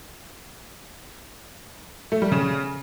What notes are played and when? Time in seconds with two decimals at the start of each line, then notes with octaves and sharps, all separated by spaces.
2.12 A3
2.22 G3
2.32 C#3